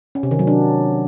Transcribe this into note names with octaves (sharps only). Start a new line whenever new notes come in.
C#4
C3
D#3
F#3
D4